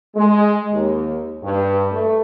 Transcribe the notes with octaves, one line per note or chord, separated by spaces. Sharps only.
G#3
D#2
G2
A3